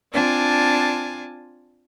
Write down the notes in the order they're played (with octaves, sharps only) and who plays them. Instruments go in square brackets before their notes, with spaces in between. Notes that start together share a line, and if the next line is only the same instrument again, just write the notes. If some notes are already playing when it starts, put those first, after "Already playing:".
[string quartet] C4 D4 F4 G#5 A5